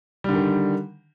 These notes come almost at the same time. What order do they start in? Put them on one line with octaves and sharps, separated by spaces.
G3 D3 D#3